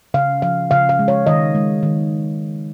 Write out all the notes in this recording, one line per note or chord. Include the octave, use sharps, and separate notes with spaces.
C#3 F5
F3 F5
C#3 F5
F5
G#3
C#5
D#3 D#5
G#3
D#3